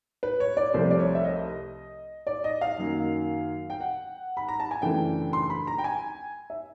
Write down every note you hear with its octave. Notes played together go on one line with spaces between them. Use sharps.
B4
C#5
D5
C2 C3 F3 A3 C5
D5
C#5
E5
D#5
D5
D#5
F5
F#2 D#3 F#3 A#3
G5
F#5
B5
A#5
A5
G#5
F#2 C#3 E3 A3 D4 G5
C6
B5
A#5
G5
G#5
E5